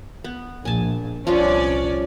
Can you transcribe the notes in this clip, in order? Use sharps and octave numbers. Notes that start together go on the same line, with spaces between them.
B3
A#1 G#5 A5
C2 F3 C#4 D4 F4 D5